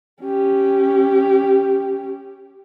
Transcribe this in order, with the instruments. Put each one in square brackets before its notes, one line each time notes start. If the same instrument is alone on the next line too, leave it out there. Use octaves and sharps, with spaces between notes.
[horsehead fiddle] C#4 G4